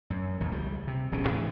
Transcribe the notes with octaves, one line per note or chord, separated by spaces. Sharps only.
F#2
A1 D#2 G#2
C#2 G3
C3
D1 B1 B2 C#4
G#2 E3